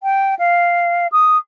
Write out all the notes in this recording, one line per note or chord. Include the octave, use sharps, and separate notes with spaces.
G5
F5
D#6